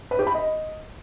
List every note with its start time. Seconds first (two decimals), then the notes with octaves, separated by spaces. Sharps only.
0.11 B4
0.19 G4
0.27 B5
0.35 D#5